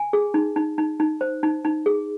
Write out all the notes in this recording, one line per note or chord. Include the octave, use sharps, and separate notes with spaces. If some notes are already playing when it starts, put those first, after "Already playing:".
Already playing: G#5
G#4
D#4
D#4
D#4
D#4
C5
D#4
D#4
G#4